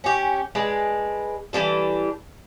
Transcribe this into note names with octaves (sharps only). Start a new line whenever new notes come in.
C#4 G4
G#3 D4 B4
E3 G3 D4 A4